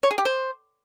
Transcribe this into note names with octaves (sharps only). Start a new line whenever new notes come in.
C#5
G#4
G4
C5